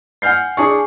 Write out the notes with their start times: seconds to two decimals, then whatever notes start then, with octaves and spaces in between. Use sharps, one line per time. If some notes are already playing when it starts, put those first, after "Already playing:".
0.22 F#5 G#5 F6 G6 C7
0.57 D4 G#4 G#5 C#6